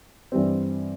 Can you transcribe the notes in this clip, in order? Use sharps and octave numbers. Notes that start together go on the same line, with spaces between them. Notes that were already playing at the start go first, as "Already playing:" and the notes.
G2 E3 G3 C4